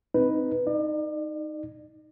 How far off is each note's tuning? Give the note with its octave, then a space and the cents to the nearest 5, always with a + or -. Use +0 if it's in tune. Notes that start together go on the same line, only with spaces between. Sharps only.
C4 -5 D#4 +0 B4 +0
D#4 +0 D5 +40